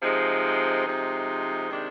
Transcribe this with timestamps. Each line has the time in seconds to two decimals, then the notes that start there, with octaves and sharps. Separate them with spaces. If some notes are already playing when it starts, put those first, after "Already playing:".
0.02 C3 F3 G#3 D#4
0.86 C3 F3 G#3 D#4
1.70 C3 D#3 G#3 D4